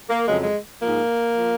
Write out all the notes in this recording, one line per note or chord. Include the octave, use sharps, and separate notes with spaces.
A#3
F2 C#3 F#3 G#3
G#3
G#2 F3 A#3
F3